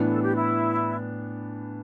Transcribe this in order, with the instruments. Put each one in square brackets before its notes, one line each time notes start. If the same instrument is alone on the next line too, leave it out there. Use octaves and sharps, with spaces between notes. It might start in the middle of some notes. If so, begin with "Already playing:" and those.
Already playing: [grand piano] A2 E3 B3 D4
[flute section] A4
G4
E4